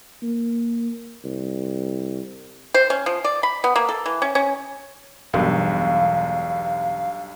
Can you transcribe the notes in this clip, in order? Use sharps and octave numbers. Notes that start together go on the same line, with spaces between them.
A#3
C2
C5
C#4
F3
D5
B5
B3
A#3
A4
E3
C#4
C#4
E1 B1 G2 F5